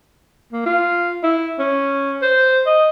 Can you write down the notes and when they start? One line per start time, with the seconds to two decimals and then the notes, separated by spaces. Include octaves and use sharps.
0.52 A#3
0.66 F4
1.23 E4
1.59 C#4
2.22 C5
2.67 D#5